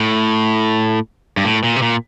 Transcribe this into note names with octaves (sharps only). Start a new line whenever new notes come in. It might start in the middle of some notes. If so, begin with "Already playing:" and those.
Already playing: A2
G2
A2
A#2
C3
A#2